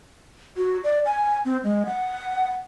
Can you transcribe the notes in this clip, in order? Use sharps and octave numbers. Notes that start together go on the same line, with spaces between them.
F#4
D5
G#5
C4
G#3
F#5